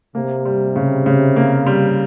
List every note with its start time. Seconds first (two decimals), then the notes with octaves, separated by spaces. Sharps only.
0.15 C3 A#3
0.45 G3
0.76 C#3
1.06 C#3
1.36 A#3
1.66 G3